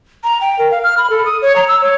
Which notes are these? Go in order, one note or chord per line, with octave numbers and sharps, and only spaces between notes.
A#5
G5
A#4
F5
F6
B5
A4
D#6
C#5
A#5
E6
C#5